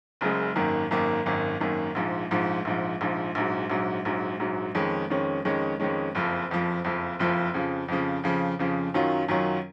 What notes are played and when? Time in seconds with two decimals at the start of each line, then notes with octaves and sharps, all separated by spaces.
0.21 F#1 F#2 C#3 G#3
0.56 G#1 F#2 D#3 A#3
0.91 G#1 F#2 D#3 A#3
1.26 G#1 F#2 D#3 A#3
1.60 G#1 F#2 D#3 A#3
1.95 A#1 G#2 F3
2.31 A#1 G#2 F3
2.65 A#1 G#2 F3
3.01 A#1 G#2 F3
3.35 A#1 G#2 F#3
3.70 A#1 G#2 F#3
4.05 A#1 G#2 F#3
4.40 A#1 G#2 F#3
4.75 F2 D#3 G#3 C#4
5.10 F2 D#3 G#3 C#4
5.45 F2 D#3 G#3 C#4
5.80 F2 D#3 G#3 C#4
6.15 F#1 F2 F3
6.50 F#1 F2 F3
6.84 F#1 F2 F3
7.19 F#1 F2 F3
7.54 F2 C#3 F3
7.88 F2 C#3 F3
8.24 F2 C#3 F3
8.59 F2 C#3 F3
8.94 F#2 D#3 F#3 C#4 F4
9.28 F#2 D#3 F#3 C#4 F4